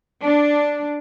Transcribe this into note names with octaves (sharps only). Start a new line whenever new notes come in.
D4